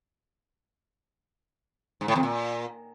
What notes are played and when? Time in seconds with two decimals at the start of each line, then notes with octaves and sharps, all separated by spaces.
2.01 G#2
2.08 A2
2.16 F2
2.23 A#2